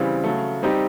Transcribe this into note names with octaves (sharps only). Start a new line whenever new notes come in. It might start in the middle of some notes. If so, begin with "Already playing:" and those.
Already playing: C#3 E3 G3 C4
C#3 F#3 A3
G3 C4 D#4 G4